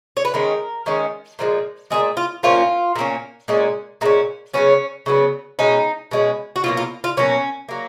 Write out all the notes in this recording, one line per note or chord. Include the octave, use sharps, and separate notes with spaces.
C#5
B4
D#3 G#3 C#4 A#4
D#3 G#3 C#4
A#2 F3 G#3
A#2 F3 G#3 G#4
F4
A#2 F3 A#3 C#4 F4
A#2 F3 A#3 C#4
A#2 G#3 C#4
A#2 G#3 C#4 D#4
C#3 F#3 B3 C#4
C#3 F#3 B3
B2 G#3 C#4 D#4
B2 G#3 C#4
F#4
B2 F#3 A#3 F4
F4
F4
B2 F#3 A#3 C#4
F#3 A#3